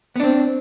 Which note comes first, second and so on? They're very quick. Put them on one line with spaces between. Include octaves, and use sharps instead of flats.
B3 D4 C4